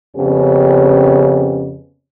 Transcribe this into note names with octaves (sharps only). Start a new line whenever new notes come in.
F2 C#3 B3 C#4 G4